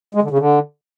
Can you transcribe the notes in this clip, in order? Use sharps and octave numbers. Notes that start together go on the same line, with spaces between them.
G#3
D3
C#3
D3